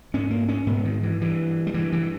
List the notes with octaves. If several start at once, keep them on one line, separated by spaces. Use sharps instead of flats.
G#2 C#4
A#3
C#4
G#2 B3
D#3
E3
G2 E3
G3
G2 E3
E3